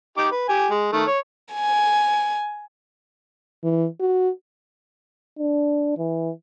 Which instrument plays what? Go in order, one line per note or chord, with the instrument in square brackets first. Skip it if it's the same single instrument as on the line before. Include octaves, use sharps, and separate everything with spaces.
[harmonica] D#4 G4 D6
B4
G4 G#5
G#3
D#3 A3
C#5
[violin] G#5
[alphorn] E3
F#4
[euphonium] D4
E3